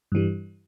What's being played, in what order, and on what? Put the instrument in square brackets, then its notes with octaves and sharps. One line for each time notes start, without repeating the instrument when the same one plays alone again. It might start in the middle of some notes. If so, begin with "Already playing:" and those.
[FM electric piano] G2 E3 G3